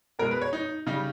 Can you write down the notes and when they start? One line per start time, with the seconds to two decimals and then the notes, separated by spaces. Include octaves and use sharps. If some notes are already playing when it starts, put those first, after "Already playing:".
0.19 B2 A#4
0.22 G#3
0.31 B4
0.42 C#5
0.53 D#4
0.86 C#3 G3 D#4